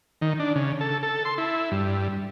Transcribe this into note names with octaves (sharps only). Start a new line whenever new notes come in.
D#3
D4
C#3
A4
A4
C6
E4
G2